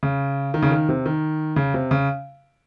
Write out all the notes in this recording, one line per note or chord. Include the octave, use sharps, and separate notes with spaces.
C#3
D#3
C#3
D#3
C3
D#3
C#3
C3
C#3